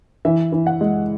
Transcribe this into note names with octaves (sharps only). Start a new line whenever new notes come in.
E3 E5
E3
F#5
G#3